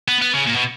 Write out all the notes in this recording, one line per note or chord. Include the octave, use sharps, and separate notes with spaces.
B3
B3
C#3
A#2
B2